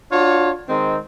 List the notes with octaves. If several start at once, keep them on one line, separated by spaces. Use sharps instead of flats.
D4 F4 F#4 C#5
D#3 G#3 C4